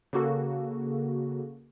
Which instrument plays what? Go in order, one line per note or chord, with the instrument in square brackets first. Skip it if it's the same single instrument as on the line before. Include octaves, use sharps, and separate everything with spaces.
[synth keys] C#3 A#3 F#4 A4